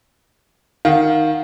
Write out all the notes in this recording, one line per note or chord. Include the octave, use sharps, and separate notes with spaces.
D#3 F5 F#5